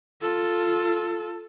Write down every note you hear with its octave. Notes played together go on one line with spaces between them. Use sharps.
F4 A4